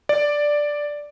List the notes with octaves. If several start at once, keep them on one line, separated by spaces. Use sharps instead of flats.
D5